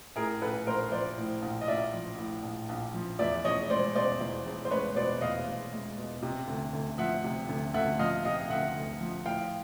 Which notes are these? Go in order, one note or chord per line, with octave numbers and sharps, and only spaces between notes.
A2 G#4 A#4
A#1 A4 B4
A#1 A#4 C5
F3 C5 D5
A2
A#1
D#5
A#1 D5 E5
F3
A2
A#1
A#1
F3
E2 D5 E5
E1 C#5 D#5
G#3 C5 D5
B2 C5 D5
E2
E1
C5
G#3 B4 C#5
B2 C5 D5
E2 D#5 F5
E1
G#3
B2
C3
D2
D2
F3 E5 F#5
C3
D2
D2 E5 F#5
F3 D#5 F5
C3 D#5 F5
D2 E5 F#5
D2
F3
A2 F5 G5